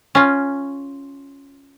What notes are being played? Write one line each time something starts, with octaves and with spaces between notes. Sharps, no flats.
C#4 F4